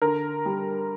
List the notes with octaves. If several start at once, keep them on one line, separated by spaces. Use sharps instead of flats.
D3 A#4
G3